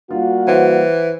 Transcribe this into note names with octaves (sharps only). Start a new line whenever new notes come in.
G3 A#3 F4 F#4
E3 C5 F#5